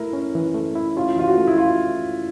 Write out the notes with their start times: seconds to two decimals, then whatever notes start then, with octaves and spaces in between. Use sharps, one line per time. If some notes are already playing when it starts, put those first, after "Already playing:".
Already playing: A3 E4 A#4
0.13 C#4
0.35 E3
0.54 A3
0.75 E4
0.97 C#4 F4
1.16 E3 F4
1.27 F#4
1.38 A3
1.47 E4
1.58 E4 F4